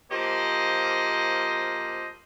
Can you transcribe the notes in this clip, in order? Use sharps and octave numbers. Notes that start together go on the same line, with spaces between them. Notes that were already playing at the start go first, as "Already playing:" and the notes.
F3 A#3 G4 C5 D#5